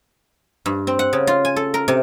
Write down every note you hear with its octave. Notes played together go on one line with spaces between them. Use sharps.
G2
C4
F#5
C#3
F4
G#5
A4
A#4
C3